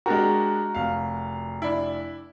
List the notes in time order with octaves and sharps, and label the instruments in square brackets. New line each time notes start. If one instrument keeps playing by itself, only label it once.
[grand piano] G#3 D4 G4 [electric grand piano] F#4 A#4 [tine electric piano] A#5
[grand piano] F1 F5
[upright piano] D4 E4